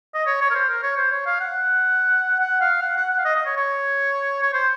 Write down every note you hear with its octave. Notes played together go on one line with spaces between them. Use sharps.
D#5
C#5
C#5
A#4
C5
A#4
C#5
C5
C#5
F5
F#5
F#5
F5
F#5
F#5
F#5
F5
D#5
D#5
C#5
C#5
C#5
C5